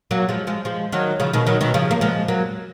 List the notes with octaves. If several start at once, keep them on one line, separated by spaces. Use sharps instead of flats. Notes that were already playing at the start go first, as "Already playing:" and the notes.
F#3 A#3
F3 G#3
F3 G#3
F3 G#3
D#3 F#3
C#3 F3
B2 D#3
D#3 F#3
B2 D#3
C#3 F3
A#3
F3 G#3
F#3 A#3